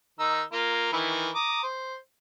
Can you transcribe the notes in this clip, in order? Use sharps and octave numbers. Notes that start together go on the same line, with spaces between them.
D#3 D#4 E6
A#3 F4 A#4
D#3 E3 E4
A#5 D6 D#6
C5